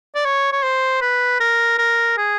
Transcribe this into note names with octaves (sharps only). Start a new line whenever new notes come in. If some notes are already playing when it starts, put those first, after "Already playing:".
D5
C#5
C#5
C5
B4
A#4
A#4
G#4